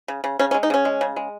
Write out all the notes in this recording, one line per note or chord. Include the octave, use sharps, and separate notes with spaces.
C#3
C#3
C#3 C#4
C#4
G#3
D#4
C#3 C#4
G#3
C#3
G#3